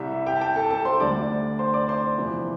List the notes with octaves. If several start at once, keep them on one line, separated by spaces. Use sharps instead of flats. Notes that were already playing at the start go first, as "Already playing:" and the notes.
Already playing: C2 C3 G3 E5
E5
G4 G5
A5
G4 G5
A4 A5
A4 A5
C5 C6
D2 D3 G3 D4 D5 D6
C5 C6
D5 D6
C5 C6
E2 C3 F3 B3